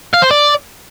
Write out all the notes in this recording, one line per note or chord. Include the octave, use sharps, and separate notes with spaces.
F5
C5
D5